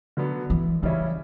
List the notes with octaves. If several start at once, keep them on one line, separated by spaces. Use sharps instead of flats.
D3 F#3 B3
E3
C#3 E3 G3 C#4 E4